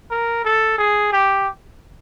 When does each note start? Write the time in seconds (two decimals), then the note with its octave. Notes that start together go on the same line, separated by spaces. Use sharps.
0.11 A#4
0.45 A4
0.78 G#4
1.12 G4